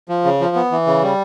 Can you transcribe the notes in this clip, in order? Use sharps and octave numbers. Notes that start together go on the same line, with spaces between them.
F3
C#3
F3
B3
E3
C#3
G3